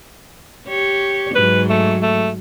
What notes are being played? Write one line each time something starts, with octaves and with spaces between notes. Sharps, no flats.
G4 C#5
G#2 F#3 B4
A3
A3